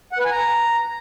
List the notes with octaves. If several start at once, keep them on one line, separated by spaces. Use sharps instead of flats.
F#5
B4
G#5
A#5